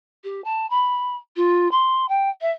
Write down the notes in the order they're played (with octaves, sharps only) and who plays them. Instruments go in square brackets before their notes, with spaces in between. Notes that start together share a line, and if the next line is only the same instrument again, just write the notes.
[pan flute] G4
A5
B5
F4
C6
G5
E5